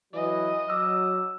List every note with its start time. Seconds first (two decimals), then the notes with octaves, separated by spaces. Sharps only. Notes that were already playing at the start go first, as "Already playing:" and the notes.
0.13 E3 F#3 D#5
0.68 F#3 D6 E6 F6